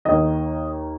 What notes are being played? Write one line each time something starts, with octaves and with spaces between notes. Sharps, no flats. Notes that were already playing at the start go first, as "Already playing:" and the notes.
D#2 D#3 A#3 D#5